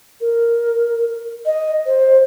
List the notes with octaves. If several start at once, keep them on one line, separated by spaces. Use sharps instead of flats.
A#4
D#5
C5